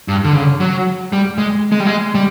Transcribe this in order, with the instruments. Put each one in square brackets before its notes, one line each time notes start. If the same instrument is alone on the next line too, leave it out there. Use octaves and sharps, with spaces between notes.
[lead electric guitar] G2
D3
C#3
F#3
G3
G#3
G#3
G3
G#3
G3